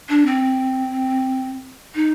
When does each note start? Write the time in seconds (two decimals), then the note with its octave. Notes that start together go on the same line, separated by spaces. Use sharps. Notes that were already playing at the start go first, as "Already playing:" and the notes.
0.09 D4
0.26 C4
1.95 D#4